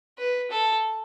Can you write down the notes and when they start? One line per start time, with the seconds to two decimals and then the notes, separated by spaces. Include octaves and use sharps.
0.18 B4
0.51 A4